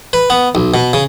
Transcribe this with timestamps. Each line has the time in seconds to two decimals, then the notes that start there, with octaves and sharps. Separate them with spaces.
0.13 B4
0.30 B3
0.55 B1
0.74 B2
0.93 C#3